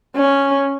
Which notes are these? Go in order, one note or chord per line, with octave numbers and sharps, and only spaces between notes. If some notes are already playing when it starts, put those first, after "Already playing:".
C#4